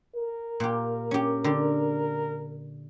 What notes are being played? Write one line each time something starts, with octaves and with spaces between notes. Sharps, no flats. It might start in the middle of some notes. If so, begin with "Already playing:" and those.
A#4
A#2 G4
C#4 G4
D3 G4